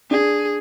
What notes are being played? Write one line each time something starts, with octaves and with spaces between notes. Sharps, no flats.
D4 G#4